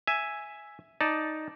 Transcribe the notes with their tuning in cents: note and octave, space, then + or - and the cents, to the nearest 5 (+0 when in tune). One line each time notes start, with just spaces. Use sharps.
E5 +0 G#5 +0
D#4 +0 D5 +0 A5 +0